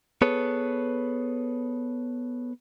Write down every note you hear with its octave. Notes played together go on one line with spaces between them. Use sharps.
B3 G#4 A4 B4 C#5